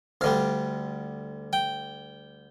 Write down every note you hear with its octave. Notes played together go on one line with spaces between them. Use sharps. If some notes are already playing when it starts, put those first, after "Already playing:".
D2 D3 G3 F5
G5